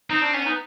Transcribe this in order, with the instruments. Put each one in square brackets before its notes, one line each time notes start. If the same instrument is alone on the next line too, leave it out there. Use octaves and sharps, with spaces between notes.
[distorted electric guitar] C4 [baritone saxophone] D#4
[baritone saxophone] D4
[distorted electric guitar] B3 [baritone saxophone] C#4
[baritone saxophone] D#4